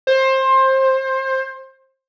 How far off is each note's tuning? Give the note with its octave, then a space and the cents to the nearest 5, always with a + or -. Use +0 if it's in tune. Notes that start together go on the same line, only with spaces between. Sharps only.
C5 +20